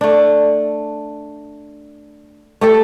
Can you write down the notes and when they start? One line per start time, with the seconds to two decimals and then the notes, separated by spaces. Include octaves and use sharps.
0.01 A3 D4
2.61 A3 G4 A4